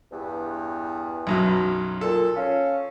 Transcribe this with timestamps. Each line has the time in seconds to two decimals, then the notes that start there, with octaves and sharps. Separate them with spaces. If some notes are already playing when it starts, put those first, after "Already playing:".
0.11 E2 G2
1.27 B1 F#2 F#3
2.01 A#2 A4
2.36 C#4 F5